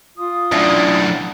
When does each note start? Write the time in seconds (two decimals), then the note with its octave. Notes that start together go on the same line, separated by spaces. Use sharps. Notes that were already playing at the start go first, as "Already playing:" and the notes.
0.18 F4 D#6
0.52 F#2 A2 D4 E4